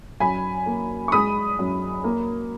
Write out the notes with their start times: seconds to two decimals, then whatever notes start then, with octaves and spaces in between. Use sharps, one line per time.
0.20 F#2 G#5 B5
0.66 A#3
1.08 C#6
1.12 G#3 B5 D#6
1.59 F#2
2.04 A#3